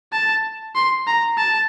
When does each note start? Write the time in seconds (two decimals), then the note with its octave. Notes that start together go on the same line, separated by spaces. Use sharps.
0.13 A5
0.75 C6
1.07 A#5
1.38 A5